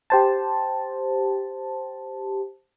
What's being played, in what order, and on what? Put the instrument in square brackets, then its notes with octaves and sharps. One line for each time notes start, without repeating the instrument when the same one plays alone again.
[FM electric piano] G4 C5 A5